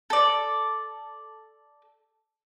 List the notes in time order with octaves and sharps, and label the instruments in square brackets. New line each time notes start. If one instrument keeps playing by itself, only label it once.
[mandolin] A4 D5